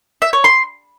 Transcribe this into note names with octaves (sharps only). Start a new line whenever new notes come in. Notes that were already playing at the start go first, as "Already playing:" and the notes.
E5
C#5
C6